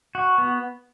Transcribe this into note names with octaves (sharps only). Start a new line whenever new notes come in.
F#4
B3